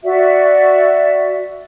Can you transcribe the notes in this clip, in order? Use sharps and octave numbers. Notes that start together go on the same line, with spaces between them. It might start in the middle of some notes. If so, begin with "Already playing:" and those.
F#4 D5 E5